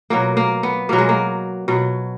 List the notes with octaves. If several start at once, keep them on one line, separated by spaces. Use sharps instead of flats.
B2 F#3 A#3
A#3
B3
B2 F#3 A#3
G#3
A#3
B2 F#3